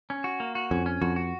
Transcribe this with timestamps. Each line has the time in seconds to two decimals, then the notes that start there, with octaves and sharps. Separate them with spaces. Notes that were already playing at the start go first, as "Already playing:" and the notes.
0.10 C#4
0.24 F#4
0.40 A#3
0.55 F#4
0.71 F2 C#4
0.86 C#4
1.02 F2 F#4
1.16 F#4